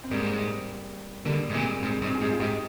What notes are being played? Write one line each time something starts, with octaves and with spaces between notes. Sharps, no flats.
C4
G#2 G3 A#3
D3 G3 A#3
G#2
A#2 G#3 C4
G#2 G#3 C4
G2 C4 D#4
G#4
G#2 D#4 G4
F4
G#2 D#4 G4